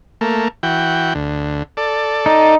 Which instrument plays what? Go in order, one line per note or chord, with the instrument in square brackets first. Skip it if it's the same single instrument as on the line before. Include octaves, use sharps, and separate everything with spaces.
[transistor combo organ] A3 A#3
E3 F#4 G5
D2
A4 D5
[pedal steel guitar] D#4